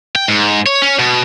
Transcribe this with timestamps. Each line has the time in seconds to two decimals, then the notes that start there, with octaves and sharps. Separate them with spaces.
0.15 G5
0.28 G#2
0.66 C#5
0.82 C#4
0.99 B2